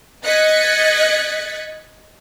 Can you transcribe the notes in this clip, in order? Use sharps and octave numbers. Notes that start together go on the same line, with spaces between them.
D#5 F#6 G#6 A6 B6 C#7